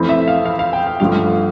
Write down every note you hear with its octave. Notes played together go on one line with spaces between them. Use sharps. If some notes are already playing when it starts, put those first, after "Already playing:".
Already playing: F2 E3 A3 C4 E4
E5
F5
F5
F5
G5
F5
G1 G2 F3 A3 F5